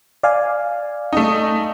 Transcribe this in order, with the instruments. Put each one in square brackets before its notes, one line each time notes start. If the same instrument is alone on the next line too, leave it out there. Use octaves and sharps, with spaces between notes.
[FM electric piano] D5 F5 G#5
[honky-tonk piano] A3 D#4